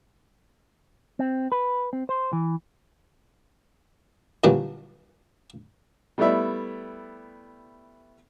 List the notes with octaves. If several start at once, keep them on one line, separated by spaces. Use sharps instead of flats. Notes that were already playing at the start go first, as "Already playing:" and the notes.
C4
B4
C4
C5
E3
A#2 D3 E3 F#3 G3
G3 A3 B3 E4 D5 E5